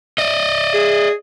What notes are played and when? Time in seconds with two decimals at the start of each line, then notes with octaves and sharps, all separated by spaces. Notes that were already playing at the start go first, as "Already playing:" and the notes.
0.18 D5 D#5
0.74 G#4